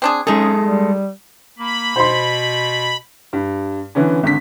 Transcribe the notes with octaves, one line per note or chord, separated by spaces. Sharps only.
C4 D4 G#4
G#3 C#4 D#4 G#4 A4
G3
A#3 B5
B2 C5 C6
G2
D3 E3 B3 C#4
G#1 D3 B6